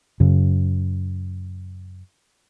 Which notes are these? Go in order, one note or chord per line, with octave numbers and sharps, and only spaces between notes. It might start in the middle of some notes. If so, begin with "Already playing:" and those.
F#2 C#3